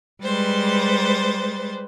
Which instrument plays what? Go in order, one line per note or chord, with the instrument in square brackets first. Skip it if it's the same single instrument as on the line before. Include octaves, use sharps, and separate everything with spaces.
[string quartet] G3 G#3 B4 C5 A6